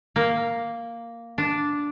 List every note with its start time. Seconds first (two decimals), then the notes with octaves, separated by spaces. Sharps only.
0.16 A#3
1.38 D4